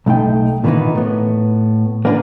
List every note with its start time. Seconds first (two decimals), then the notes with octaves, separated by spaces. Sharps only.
0.06 B1 A3 D#4 G5
0.64 A#2 D#3 E3 A3 B3 D#4
0.95 A2 B3
2.05 A#3 B3 D4 A#4 B4